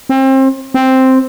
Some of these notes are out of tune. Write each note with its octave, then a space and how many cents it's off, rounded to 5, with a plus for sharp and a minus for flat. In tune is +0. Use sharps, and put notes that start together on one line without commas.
C4 +30
C4 +0